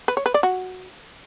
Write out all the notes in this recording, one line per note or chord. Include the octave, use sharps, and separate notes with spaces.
B4
C#5
B4
D5
F#4